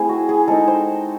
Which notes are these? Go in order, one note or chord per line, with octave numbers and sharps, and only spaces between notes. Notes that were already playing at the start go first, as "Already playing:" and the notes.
Already playing: A3 C4 E4 G#4 C5
F#4
G#4
G#3 C4 D#4 A4
C5